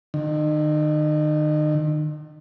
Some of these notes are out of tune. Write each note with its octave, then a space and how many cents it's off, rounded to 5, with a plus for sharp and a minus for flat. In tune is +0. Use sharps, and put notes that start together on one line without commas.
D#3 -35